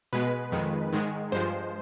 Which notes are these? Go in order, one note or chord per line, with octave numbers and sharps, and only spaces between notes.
B2 G#3 B4
F2 D#3 G#3
G#2 D#3 G#3
G2 F3 G#3 C5